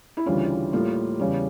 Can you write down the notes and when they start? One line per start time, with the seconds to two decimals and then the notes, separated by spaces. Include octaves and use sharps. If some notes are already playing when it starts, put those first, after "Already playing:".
0.17 E4
0.26 D2 C#3 E3 G3 F4
0.72 A2 G3 A#3 F4
1.19 E2 C#3 G3